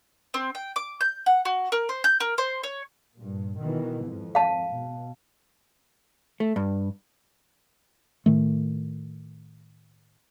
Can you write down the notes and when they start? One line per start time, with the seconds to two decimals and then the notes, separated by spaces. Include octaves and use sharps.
0.34 C4
0.55 G5
0.76 D6
1.01 G6
1.26 F#5
1.45 F#4
1.72 A#4
1.89 C5
2.04 G6
2.20 A#4
2.38 C5
2.63 C#5
3.16 G2 A#2
3.60 B2 D#3 E3
4.01 G#1 F2
4.35 F5 A5
4.75 B2
6.40 A3
6.56 G2
8.26 A2 D#3 A3